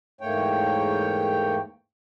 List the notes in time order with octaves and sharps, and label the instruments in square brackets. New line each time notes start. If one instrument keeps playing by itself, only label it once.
[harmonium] E2 G#2 A3 A#3 C#5 G5